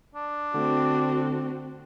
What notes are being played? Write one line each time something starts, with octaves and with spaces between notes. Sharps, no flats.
D4
D3 A3 C4 F#4